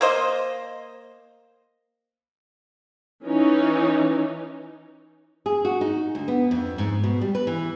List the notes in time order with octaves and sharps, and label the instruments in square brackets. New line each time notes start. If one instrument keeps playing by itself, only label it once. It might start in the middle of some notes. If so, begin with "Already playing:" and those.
[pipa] A#3 C5 D#5
[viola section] E3 C#4 D#4
[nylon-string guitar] G#4
F#4
D#4
D2
B3
F2
G#2
B2
G3
B4
E3